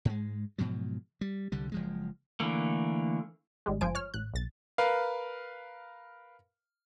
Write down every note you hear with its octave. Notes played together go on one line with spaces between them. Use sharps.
G#2 G#3
G#2 B2 F3 F#3
G3
C2 D3 G3
F#1 F3 G#3
D3 E3 A3 A#3
G#1 G3 G#3
G1 F3 C5 G#5 D7
C#5 F6
A1 F#6
B1 A6
A#4 B4 F5